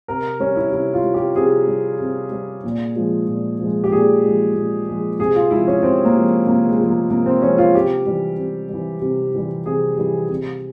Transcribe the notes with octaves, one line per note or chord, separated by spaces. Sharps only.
C3 A#4
G3 C#4
E4
C3 E4
F4
G3
G4
C3 G#4
G3
C3
G3
A#2
F3 G#3
A#2
F3 G#3
G4
A#2 G#4
F3 G#3
A#2
F3 G#3
C3 G#4
F4
F3 G#3 E4
C#4
C3 C4
A#3
F3 G#3
C3 A#3
G#3
F3 G#3
A#3
C3 A#3
C4
F3 G#3 C#4
F4
C3 G4
E3 G3
C3
E3 G3
C3
E3 G3
C3 G#4
E3 G3
C3